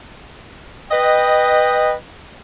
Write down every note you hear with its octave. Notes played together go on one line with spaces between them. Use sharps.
B4 D#5 G5